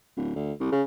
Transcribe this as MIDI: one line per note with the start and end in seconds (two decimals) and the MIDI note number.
0.17 0.35 26
0.35 0.53 38
0.60 0.68 36
0.72 0.83 49